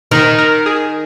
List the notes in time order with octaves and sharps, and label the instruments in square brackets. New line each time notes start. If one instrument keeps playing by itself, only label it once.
[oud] D#3 [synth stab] A#4
[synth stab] A#4
G#4